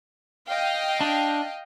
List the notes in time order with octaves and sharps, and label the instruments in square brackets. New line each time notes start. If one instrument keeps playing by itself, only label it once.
[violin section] D#5 F5 G5
[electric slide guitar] D4